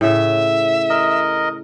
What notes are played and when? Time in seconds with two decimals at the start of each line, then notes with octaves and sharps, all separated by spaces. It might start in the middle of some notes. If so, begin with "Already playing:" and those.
0.01 A2 C#3 E5
0.90 A#4 D#5